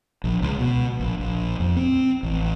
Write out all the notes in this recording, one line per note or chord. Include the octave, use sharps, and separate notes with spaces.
A#1
C#2
B2
A#1
A#1
F2
C4
A1